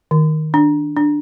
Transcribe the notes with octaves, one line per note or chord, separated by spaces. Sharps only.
D#3
D4
D4